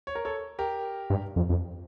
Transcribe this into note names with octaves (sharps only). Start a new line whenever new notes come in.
C#5
A#4
A4 C#5
G4 A#4
G2
F2
F2